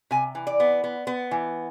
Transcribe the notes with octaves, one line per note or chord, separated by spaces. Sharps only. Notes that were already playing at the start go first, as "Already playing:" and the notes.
C3 G#5
E3
D5
B3
B3
B3
E3